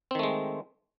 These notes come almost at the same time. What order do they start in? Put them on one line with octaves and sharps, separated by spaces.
C4 D#3 A3 G#3